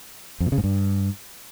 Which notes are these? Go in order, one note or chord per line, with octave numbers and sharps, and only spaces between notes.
F2
B2
C#3
G#2
G2